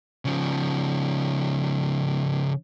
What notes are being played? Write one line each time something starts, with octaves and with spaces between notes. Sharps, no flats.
C#3 F3